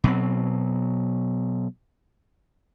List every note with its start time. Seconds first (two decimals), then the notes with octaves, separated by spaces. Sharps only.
0.04 B2 F#3 C4